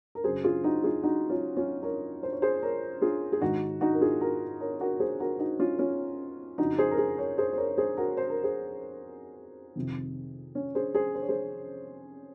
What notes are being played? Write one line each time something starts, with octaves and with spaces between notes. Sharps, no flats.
A#4
F#2 C#3 G#4 C5
F4 G#4
D#4 F#4
F4 G#4
D#4 F#4
C#4 F4
C#4 F4
A#4 C#5
C5
C#5
G#4 C5
A#4 C#5
F4 G#4
G#4
G#2 D#3 D#4 F#4
D#4 F#4
A#4
F4 G#4
F#4 A#4
A#4 C#5
F#4 A#4
G#4 C5
F#4 A#4
D#4 F#4
C#4 F4
C#4 F4
F2 C#3 D#4 F#4
G#4 C5
A#4
G#4 C5
A#4 C#5
G#4 C5
C5
A#4 C#5
G#4 C5
F#4 A#4
C5
A#4
G#4 C5
F2 C3 D#3
C#4
G#4 C5
G#4 C5
C5
C#5
G#4 C5